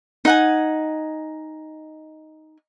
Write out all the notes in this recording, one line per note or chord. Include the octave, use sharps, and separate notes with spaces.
D#4 F#5 G#5